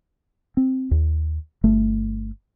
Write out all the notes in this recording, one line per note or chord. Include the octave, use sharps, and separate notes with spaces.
C4
D#2
G1 A3